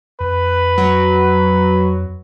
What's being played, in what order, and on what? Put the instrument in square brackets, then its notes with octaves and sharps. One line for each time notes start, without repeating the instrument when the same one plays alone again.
[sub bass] F2 [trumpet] B4
[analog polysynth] F#3